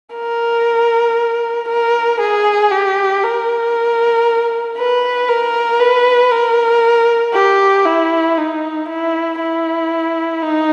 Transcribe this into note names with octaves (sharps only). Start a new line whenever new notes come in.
A#4
A#4
G#4
G4
A#4
B4
A#4
B4
A#4
G4
E4
D#4
E4
E4
D#4